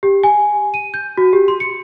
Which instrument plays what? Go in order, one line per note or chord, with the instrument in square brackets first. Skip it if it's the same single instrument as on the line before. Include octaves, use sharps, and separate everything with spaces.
[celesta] G4
G#5
D#7
G6
F#4
G4
C6
C#7